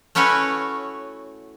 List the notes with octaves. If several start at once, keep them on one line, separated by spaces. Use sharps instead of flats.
A3 C#4 E4 F#4 B4 C#5